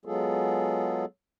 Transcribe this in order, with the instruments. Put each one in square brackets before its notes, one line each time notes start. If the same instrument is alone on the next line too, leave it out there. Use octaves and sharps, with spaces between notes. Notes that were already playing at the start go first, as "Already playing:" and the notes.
[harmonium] F#3 G#3 B3 F4 G#4 A4